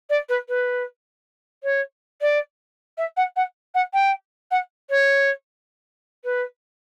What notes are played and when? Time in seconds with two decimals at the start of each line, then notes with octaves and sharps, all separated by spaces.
0.09 D5
0.29 B4
0.48 B4
1.63 C#5
2.21 D5
2.97 E5
3.16 F#5
3.36 F#5
3.74 F#5
3.93 G5
4.51 F#5
4.89 C#5
6.24 B4